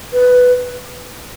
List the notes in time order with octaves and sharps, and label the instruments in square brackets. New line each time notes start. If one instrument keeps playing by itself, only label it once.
[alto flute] B4